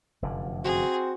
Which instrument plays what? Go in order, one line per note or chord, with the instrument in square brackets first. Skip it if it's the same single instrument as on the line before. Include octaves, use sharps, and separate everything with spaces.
[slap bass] F1 F#2 D3
[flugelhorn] C4 [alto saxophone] F#4 [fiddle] G#4